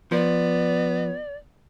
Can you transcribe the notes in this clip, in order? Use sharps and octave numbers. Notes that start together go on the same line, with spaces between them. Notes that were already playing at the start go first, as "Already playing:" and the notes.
F3 B3 D5